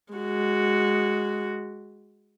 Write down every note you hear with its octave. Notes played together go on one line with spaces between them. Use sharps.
G#3 F#4